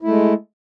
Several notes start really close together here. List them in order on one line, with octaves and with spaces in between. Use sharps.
E4 A3 G#3